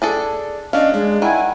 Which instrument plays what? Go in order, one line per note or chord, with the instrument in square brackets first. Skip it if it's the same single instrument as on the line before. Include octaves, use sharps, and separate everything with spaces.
[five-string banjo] D4 G#4 A4
[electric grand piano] C#4 D4 [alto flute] D#5 [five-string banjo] F5
[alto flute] G#3 [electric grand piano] D4
[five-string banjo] D#3 [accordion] E4 G#5 [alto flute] F#5